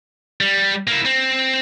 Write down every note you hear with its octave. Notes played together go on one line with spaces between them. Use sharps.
G3
A#3 E4
C4